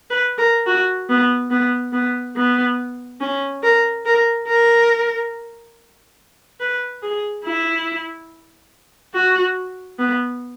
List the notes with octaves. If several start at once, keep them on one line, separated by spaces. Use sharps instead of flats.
B4
A#4
F#4
B3
B3
B3
B3
C#4
A#4
A#4
A#4
B4
G#4
E4
F#4
B3